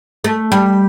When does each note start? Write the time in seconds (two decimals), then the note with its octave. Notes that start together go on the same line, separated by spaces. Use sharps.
0.24 A3
0.52 G3